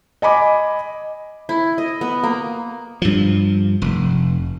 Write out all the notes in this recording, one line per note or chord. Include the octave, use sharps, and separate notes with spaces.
D#5 G#5 B5 D6
E4
D#5
B3
A#3
G2 F3
F1